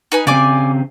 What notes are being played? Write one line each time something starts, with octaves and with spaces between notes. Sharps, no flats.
D#4 B4 G#5
C#3 C4 D5 G#5 D6